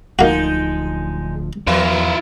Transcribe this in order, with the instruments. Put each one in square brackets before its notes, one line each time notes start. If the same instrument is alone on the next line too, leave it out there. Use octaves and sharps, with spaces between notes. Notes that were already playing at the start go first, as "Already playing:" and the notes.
[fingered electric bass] D1 D2 F3 [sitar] G#3 D#4 [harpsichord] A#3 F#4
[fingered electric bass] E2 [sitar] F3 B3 A#4 [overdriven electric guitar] E4 F4